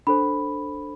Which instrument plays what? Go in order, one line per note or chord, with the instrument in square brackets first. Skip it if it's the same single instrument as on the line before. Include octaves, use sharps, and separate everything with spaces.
[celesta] D4 A4 C5 B5